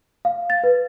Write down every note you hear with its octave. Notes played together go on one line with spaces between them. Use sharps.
F5
A6
B4